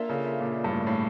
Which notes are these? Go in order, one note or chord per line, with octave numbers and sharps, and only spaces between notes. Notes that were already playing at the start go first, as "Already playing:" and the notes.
Already playing: A#3 D4 F4 A4 E5
C#3
A#2
G2
A2
A2